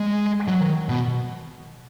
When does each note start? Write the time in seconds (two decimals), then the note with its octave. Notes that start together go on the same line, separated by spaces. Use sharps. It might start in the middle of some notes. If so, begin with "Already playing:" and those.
Already playing: G#3
0.48 F#3
0.61 D#3
0.89 B2